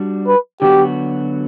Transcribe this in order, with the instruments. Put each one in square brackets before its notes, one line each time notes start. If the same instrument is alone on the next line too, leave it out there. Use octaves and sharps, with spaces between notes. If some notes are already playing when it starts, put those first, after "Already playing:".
Already playing: [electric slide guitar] G3 D4 F#4
[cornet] B4
[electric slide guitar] D3 F#3 B3 F#4 [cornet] G4